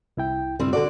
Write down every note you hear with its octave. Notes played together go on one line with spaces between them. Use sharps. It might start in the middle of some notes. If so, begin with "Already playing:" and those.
C2 E4 G5
C#2 G2 G3 C4 E4
D3 F#4 A4 D5